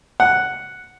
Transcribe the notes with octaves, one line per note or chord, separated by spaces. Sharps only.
F#5